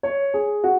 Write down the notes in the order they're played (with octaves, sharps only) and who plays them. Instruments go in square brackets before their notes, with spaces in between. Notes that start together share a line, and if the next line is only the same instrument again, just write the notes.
[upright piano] C#5
G#4
F#4